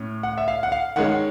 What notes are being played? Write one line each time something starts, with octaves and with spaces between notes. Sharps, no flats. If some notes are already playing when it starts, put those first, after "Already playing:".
Already playing: A2 C#4
F#5
E5
F5
F#5
F5
D#3 G#3 C#4 F#5